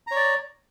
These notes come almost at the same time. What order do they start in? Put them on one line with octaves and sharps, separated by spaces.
A#5 C#5 D5